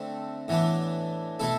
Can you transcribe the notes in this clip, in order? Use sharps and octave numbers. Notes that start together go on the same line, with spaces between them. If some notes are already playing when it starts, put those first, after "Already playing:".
Already playing: D3 A3 C4
A2 E3 B3 D4
B2 A3 E4 A4